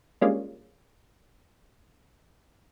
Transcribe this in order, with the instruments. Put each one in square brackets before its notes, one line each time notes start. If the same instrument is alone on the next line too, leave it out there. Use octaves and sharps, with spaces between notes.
[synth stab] G3 G#3 A#3 C#4 D4 F4